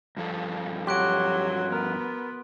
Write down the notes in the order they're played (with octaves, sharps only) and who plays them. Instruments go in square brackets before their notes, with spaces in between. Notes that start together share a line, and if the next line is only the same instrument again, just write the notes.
[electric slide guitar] G2 F3 A4
[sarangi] F#3 [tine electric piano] F#4 G4 [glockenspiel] C6 F#6 D7
[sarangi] B3 [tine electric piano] A#4